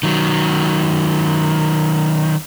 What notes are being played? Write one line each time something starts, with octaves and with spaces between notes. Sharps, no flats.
D#3 F#3